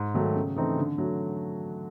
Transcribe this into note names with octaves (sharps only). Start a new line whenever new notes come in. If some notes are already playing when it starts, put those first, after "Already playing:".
Already playing: G#2
D#3 F#3 A3
C#3
E3 A3 C4 D#4
D3
F#3 A3